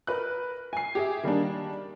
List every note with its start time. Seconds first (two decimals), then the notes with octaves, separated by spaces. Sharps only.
0.07 A#4 B4 F#6
0.73 G#5 C7
0.95 G4 G#4 E5
1.23 D#3 G3 A#3 D4